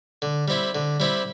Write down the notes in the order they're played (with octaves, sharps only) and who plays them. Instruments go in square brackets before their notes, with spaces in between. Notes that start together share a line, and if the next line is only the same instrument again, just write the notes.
[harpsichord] D3
G3 C4 E4
D3
G3 C4 E4